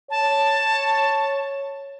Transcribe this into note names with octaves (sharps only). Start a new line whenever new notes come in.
C#5 A5